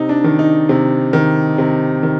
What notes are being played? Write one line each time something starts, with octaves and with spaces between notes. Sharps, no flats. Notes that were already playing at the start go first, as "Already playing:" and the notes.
Already playing: C3 D#4
D4
D#3
D#4
C3
D#3
C3
D#3